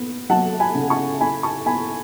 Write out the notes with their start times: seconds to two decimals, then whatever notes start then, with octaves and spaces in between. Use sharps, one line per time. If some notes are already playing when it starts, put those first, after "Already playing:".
Already playing: B3
0.29 F#3 F#5 A5
0.60 G#5 B5
0.75 C#3
0.90 A5 C#6
1.20 E4 G#5 B5
1.43 A5 C#6
1.66 B3 G#5 B5